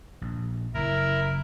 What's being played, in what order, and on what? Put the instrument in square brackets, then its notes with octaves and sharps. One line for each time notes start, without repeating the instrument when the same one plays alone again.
[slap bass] A#1
[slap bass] F#1 [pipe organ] E4 A#4